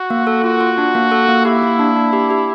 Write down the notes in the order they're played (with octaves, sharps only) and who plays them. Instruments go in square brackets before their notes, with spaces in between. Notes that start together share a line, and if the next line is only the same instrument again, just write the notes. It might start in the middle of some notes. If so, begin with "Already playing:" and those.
Already playing: [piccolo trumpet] F#4
[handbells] A#3
A4
[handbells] F4 [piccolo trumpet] F#4
[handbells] F4
D4
A#3
A4
A#3
[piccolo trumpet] E4 [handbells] G4
[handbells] A#3
D4
D4
G4
G4